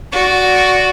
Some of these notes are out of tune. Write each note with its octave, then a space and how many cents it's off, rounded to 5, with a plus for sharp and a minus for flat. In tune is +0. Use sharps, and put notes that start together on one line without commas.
F#4 +0 D5 -15